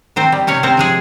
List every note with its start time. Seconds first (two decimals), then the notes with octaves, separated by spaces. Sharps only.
0.16 D#3 C4 C5
0.32 G3
0.47 C3 C#4 C#5
0.63 C3 C4 C5
0.77 F3 G#3 G#4